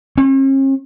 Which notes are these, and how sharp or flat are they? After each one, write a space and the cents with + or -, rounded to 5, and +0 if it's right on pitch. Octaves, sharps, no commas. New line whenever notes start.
C#4 -45